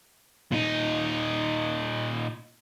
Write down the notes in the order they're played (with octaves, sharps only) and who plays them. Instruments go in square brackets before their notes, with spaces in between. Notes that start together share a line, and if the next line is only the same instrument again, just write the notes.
[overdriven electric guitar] A#2 D#4